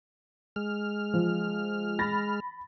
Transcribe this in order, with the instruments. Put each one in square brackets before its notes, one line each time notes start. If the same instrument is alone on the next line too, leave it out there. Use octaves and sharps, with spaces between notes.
[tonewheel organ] G#3 F6
[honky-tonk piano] F3
B5 A6 A#6